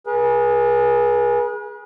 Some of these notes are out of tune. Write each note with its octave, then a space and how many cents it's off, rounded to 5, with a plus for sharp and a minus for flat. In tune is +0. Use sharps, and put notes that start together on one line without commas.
G#4 +0 B4 -45